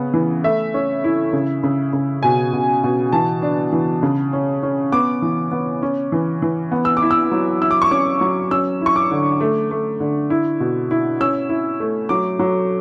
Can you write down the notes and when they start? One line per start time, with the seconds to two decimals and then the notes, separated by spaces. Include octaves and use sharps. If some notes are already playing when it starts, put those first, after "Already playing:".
Already playing: C#3 B3
0.14 E3
0.44 A3 E5
0.74 C#4
1.04 E4
1.33 C#3
1.64 C#3
1.93 C#3
2.23 B2 G#5
2.53 B2
2.84 B2
3.12 E3 A5
3.42 D4
3.72 E3
4.03 C#3
4.33 C#4
4.63 C#4
4.92 B3 D6
5.22 E3
5.51 B3
5.82 C#4
6.12 E3
6.42 E3
6.71 B3
6.85 E6
6.97 D6
7.02 E4
7.11 E6
7.32 F#3
7.62 E4 E6
7.71 D6
7.82 C#6
7.91 C#4 D6
8.21 F#3
8.51 C#4 E6
8.81 E4 C#6
8.96 D6
9.11 D3
9.41 A3
9.71 A3
10.00 D3
10.30 E4
10.60 B2
10.91 E4
11.21 C#4 E6
11.49 E4
11.80 A3
12.09 F#3 D6
12.39 F#3